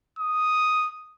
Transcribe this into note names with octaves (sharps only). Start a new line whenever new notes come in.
D#6